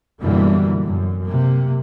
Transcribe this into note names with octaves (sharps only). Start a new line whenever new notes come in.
F#2 B2 D3 E3 G3 A#3
F#2
C3 A#3